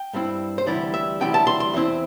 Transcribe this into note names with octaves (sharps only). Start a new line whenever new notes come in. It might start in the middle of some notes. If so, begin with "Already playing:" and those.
Already playing: G5
G2 G3 C4 E4
C5
D2 C3 E3 G3 E4 D5
E5
D2 C3 E3 G3 E4 G5
A5
C6
C6
E2 E3 C4 E4